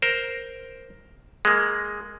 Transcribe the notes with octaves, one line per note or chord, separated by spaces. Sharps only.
A#4 C5
G#3 A#3